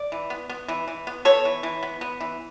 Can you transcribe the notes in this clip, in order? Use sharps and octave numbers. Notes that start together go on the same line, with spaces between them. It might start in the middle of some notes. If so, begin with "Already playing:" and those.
Already playing: D5
E3
B3
B3
E3
E3
B3
B3 A4 C#5
E3
E3
B3
B3
E3